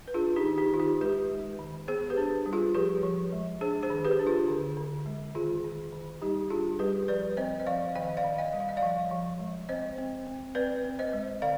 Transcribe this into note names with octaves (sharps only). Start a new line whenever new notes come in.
B4
D4 F4 G#4
D#4 G4
D#3
D#4 G4
D#3 F4
D#4 G4
G#3 G4 B4
G#3
D#3
B3 G#4 C5
G4 B4
D4
G3
F4 G#4
F3 G4 B4
F3
G#3
D4 G#4 C5
G#4 C5
D#3
G4 B4
D4
F4 G#4
D3
D3
G#3
D#3 F4 G#4
D#3
D#3
G3 D#4 G4
D4 F4 G#4
G3 G4 B4
F3 B4 D5
C4 C5 D#5
D#5
F3 D5 F5
D#3 D#5 G5
D5 F5
D#3
D#5 G5
G3
F5
D#5
D5 F5
F3
F3
G#3
C4 C5 D#5
C4
C4
C4 B4 D5
C4
C5 D#5
G#3
D3 D5 F5